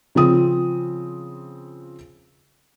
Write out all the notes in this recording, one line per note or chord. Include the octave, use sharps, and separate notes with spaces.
C#3 F3 C4 D#6